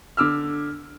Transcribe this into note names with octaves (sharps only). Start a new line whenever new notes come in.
D3 D6 E6 F6